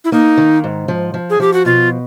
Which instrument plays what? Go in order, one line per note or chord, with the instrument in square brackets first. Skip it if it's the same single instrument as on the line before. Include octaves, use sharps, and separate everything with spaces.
[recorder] E4
[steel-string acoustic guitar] A#3 [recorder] D#4
[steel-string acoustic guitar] D#3
G#2
F3
F3
[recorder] G#4
[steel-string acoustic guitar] F3 [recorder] G4
[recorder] F#4
[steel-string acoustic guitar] B2 [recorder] F4